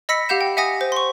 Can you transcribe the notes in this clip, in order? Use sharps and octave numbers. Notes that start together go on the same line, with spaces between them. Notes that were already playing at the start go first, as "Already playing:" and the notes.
D#5 B5 E6 A#6 B6 C#7
G4 F5 F#5 G6 E7
G5
E5 F#5 G#5 D#6 A#6
C5
C6 C#6